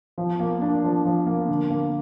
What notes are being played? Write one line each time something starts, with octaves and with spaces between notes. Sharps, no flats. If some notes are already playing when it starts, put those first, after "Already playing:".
F3
A#3
D4
F3
F3
A#3
D3
A#3